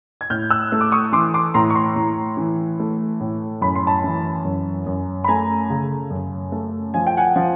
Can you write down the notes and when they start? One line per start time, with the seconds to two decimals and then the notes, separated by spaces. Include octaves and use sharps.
0.21 G#6
0.30 A2 F6 G6
0.50 E6 F#6
0.72 A3
0.81 D6
0.92 C#6 D#6
1.12 E3 C6 D6
1.34 C6 D6
1.54 A2 A#5 C6
1.70 C#6
1.75 A#5 C6
1.96 A2
2.37 E3
2.80 A3
3.20 A2
3.62 F#2 B5
3.75 C6
3.87 A5 B5
4.04 E3
4.45 F#2
4.86 F#2
5.24 B5
5.28 A3 G#5 A#5
5.70 C#3
6.11 F#2
6.52 A3
6.94 F3 G#5
7.07 G5
7.17 F#5 G#5
7.36 F3